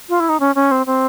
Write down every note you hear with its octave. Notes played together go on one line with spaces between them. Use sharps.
F4
E4
D#4
C#4
C#4
C4
C4